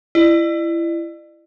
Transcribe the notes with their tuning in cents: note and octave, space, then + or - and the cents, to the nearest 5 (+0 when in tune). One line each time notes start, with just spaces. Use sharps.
E4 +25 D5 +45